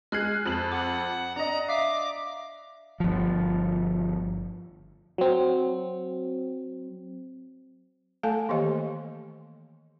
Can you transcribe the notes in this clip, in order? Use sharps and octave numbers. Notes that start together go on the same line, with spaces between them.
G#3 F6 F#6 G#6 C7
F2 F#7
F#5 D6
D4 D#5 A#5
E5 F5 D6
G1 F3
F#3 C4
A3 A4 F5 G#5 A5
D#3 E3 A#3 G4 C5 D#5